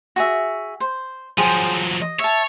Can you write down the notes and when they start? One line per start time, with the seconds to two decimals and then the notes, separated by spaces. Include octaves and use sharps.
0.16 F#4 G#4 E5
0.80 C5
1.38 F3 F#3 G#4 C5 G5
2.01 D#5
2.20 C#5 E5 A5